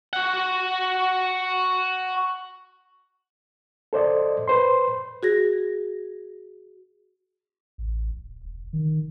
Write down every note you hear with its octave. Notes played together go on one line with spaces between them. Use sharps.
F#4 F#5
A4 C5 D5 D#5
B4 C5 C6
F#4 G#4 A#6
A1
D1
E1
D#3